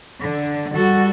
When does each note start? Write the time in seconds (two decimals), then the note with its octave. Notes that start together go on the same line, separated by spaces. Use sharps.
0.20 D3
0.73 G3 F#4 A4